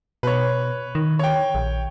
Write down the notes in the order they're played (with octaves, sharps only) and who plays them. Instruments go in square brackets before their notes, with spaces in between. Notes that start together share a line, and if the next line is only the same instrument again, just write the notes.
[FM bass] B2 [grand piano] B4 C#5
[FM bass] D#3
[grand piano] C#5 G5
[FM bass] A#1